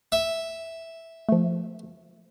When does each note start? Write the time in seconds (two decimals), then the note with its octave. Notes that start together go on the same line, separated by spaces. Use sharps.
0.12 E5
1.29 F3 A3